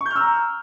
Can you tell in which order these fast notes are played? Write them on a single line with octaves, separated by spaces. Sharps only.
C#6 G6 F6 E6 A#5